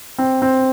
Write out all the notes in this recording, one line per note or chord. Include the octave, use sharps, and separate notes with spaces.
C4
C4